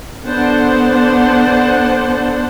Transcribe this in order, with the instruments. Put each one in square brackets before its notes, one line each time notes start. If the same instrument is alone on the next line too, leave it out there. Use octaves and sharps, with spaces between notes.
[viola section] D3 B3 D4 C5 F#5 A5